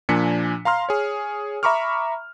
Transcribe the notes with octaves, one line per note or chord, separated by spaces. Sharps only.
A#2 F3 D4 G#5 B6 C#7
F5 A#5 C6 F6
G#4 C#5
E5 A#5 B5 C#6 D6 F6